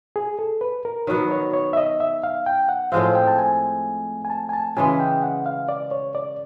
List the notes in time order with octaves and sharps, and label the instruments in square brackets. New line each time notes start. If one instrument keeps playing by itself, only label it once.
[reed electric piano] G#4
A4
B4
A#4
[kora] D#3 F#3 B3 [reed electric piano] C#5
[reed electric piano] C#5
C#5
E5
D#5
E5
F5
G5
F#5
[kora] A2 F3 G#3 C4 [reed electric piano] F5
[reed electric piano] G5
A5
G#5
G#5
A5
G#5
A5
[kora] C#3 E3 G#3 [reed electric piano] G#5
[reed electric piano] G5
F#5
F5
D5
C#5
D5